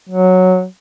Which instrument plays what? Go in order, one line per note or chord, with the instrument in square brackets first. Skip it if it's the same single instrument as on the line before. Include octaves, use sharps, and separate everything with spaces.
[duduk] F#3